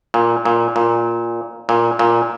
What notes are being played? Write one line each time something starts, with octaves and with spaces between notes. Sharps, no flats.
A#2
A#2
A#2
A#2
A#2